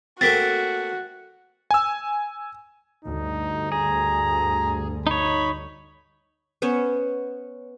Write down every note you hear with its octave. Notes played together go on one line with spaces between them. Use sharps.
A3 A#3 C4 F#4 A6 B6
G#5 E6
D2 G2 D#4
G#4 A#5
D#4 C#5 B5
B3 C#4 C5 C#5